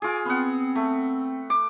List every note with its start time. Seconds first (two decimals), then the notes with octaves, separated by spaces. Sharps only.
0.02 F4 G#4 G#5 D6
0.26 B3 C4 F#5
0.75 A3
1.50 D6